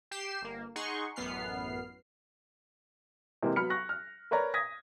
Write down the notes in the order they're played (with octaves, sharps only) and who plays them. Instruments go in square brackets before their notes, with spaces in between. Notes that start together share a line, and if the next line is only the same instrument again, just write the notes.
[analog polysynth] G4 G5 C7 E7
G1 A#3
D#4 G#4 F#5 C6 C#6
A1 F#2 B3 F6 C7
[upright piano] C3 E3 G#3 A#3 C4
F#3 B3 B5 F6 C#7
C#6 F#6 A#6
F6
A#4 B4 C#5 D5 A#5
D#6 G#6 A#6 B6